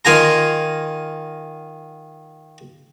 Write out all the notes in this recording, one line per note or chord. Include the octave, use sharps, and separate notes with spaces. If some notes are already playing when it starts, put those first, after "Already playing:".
D#3 F4 G#5 A#5